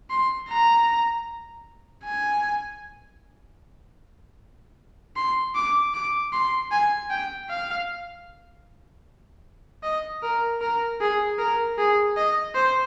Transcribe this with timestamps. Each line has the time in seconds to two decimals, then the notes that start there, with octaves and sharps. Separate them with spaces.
0.10 C6
0.49 A#5
2.05 G#5
5.17 C6
5.56 D6
5.94 D6
6.33 C6
6.72 G#5
7.10 G5
7.50 F5
9.83 D#5
10.23 A#4
10.61 A#4
11.01 G#4
11.39 A#4
11.78 G#4
12.17 D#5
12.55 C5